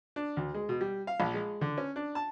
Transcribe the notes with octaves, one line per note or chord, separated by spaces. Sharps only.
D4
D2
G#3
B2
G3
F5
A#1
G#3
D3
C#4
D4
A5